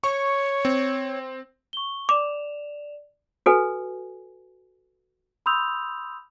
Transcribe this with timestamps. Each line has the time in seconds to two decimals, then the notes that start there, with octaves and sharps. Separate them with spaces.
0.04 C#5 C#6
0.65 C4
1.73 C#6 G7
2.09 D5 D6 E7 F7
3.46 F#4 A4 B4 G#5
5.46 B5 C6 D#6 E6 G6 F7